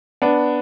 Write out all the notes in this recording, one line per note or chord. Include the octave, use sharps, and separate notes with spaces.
B3 D4